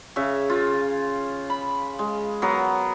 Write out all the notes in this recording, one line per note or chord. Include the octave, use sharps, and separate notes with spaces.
C#3 C#5 E5
F4
B5
G#3
F#3 B3 A#4